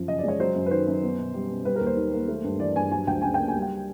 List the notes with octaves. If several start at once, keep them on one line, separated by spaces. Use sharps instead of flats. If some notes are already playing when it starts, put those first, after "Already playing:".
Already playing: F#2 F3
C#3 D#5
D5
G#3
C#5
F#3 C5
F#2
B4
D#3 C5
F#2
B3
B2
G3
B2
G3 B4
A#4
D#2
C5
D#3
A#3
A3
G2
E3 D5
G2 G#5
F#3 G#5
D2 G5
C#3 G#5
A#3 G5
G#5
G3
G5